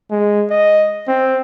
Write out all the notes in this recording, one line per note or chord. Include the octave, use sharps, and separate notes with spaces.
G#3
D#5
C4